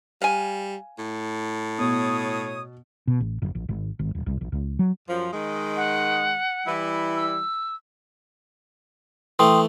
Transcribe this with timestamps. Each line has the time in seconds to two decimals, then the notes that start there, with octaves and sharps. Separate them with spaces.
0.22 G3 F5 G#5
0.98 A2
1.79 B2 C#5 D#6
3.07 B2
3.20 A1
3.42 F#1
3.55 A#1
3.69 G#1
3.99 G#1
4.15 D#1
4.26 C2
4.41 A#1
4.52 C#2
4.79 F#3
5.08 F#2 F3
5.32 D#3 G#3
5.77 F#5
6.67 E3 G3 E4
7.16 E6
9.39 E3 A3 G5 C6 D#6